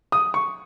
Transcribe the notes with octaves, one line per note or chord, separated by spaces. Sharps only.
D#6
C#6